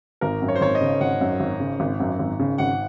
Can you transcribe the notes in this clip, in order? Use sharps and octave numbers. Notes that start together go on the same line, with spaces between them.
G#1 A#4
F#2
C#5
C5
G#1 C#5
D#5
C#3
G#1 F#5
F#2
G#1
C#3
G#1
F#2
G#1
C#3
G#1 F#5